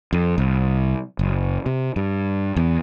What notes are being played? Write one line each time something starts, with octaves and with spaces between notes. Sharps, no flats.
F2
C2
F#1
C3
G2
E2